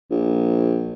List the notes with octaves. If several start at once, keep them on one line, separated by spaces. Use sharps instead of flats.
A#1